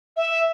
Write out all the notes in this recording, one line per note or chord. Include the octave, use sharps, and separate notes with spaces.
E5